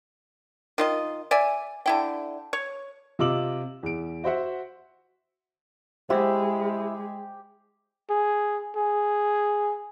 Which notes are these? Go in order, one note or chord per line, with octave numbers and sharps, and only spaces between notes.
D#3 F4 D#5
D5 E5 G#5
D3 E4 G5
C#5
C3 F4 D#5 D6 E6 F#7
E2 D7
F#4 C5 E5 F#5
G#3 E4 G4 C5 E5 F#5
G#4
G#4